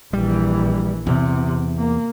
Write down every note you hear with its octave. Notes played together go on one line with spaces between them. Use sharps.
A#1 E3 G3
E2 C3
A#3